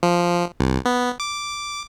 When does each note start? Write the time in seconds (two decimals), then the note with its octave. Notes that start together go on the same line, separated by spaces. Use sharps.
0.03 F3
0.60 C2
0.85 B3
1.20 D6